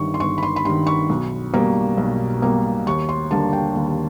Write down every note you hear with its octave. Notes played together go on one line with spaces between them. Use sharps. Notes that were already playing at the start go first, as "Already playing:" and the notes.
Already playing: G1 G2 D#3 C#6
C6
G1 C#6
B5
C6
B5
G2 D#3 C6
C#6
B1
B2 G3 A#3
B1
B2 G3 A#3
D#2 C#6
C6
D3 G3 A#3 A5
G5
D#2